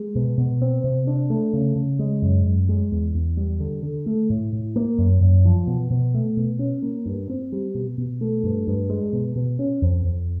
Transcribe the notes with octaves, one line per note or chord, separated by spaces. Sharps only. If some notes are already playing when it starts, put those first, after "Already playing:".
Already playing: G#3
B2
B2
C4
C3
D4
A3
C#3
C#3
G#3
F#2
F#2
G#3
E2
E2
G3
D3
D3
A3
A2
A2
A#3
F#2
F#2
F3
B2
B2
A3
B2
C#4
A#3
G2
C4
G3
B2
B2
A3
G2
G2
G#3
B2
B2
C#4
F2
F2